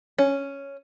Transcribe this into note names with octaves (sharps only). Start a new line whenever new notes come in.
C#4